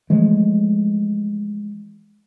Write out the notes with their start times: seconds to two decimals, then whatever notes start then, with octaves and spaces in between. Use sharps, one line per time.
0.10 E3 F3 G#3 A3